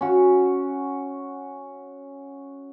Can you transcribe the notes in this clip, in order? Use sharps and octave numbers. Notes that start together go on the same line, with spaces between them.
C#4 F#4